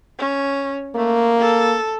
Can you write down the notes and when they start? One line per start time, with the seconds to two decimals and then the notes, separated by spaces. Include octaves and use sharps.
0.18 C#4
0.95 A3 A#3
1.39 A4